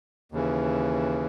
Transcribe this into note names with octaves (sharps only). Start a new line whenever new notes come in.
D#2 C#3 E3